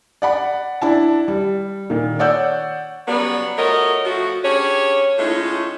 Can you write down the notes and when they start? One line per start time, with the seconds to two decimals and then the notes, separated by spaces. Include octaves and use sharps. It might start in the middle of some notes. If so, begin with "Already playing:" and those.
0.22 D5 F#5 B5
0.82 D4 E4 A5
1.28 G3
1.90 A#2 D#3
2.19 C#5 D5 F#5 E6 G6
3.07 C#3 F#3 G3 B3
3.57 A3 F4 F#4 A#4 C#5 D#5
4.05 F3 A3 F#4
4.44 C#4 D4 G4 G#4 C#5
5.18 A2 G#3 A3 C#4 D#4 F4